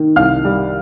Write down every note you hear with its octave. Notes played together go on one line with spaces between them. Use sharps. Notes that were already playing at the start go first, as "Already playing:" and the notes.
Already playing: D#3 A#3
C2 F5 F6
G3